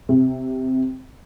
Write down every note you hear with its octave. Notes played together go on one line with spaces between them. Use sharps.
C3